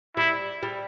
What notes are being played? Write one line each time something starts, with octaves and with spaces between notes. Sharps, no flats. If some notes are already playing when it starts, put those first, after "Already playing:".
G3 E4
G3